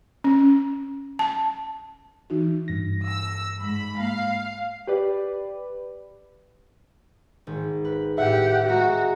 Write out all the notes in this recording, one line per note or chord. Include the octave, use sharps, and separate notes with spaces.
C#4
A5
E3 D#4 F#4
G2 A#6
E6
G#2 B5
A#3 F5
G4 B4 D5
G#1
B4
A2 G4 E5 F#5
G#3 F#4 A#5